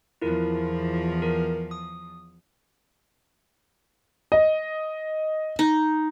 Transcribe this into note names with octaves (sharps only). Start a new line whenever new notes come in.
E2 F3 E4 F4 A#4
A#4
D#6
D#5
D#4